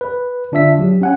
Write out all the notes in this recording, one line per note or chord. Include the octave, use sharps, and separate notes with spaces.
B4
D3 D4 F4 E5 B6
F#3 G4
C#4 F#5 G#5